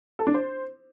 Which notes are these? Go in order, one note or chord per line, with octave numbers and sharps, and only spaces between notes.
A4
D4
C5